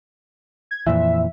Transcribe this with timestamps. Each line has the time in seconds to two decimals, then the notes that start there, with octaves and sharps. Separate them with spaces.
0.71 G#6
0.87 F2 A#2 E3 E5